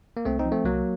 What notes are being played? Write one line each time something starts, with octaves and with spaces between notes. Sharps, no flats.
A#3
C2 A3 C4
C4 D#4
F3
A3 C4
C2 F#3 A#3